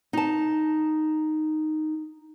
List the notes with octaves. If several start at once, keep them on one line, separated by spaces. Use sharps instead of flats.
D#4 A5